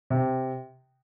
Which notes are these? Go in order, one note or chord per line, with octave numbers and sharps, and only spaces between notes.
C3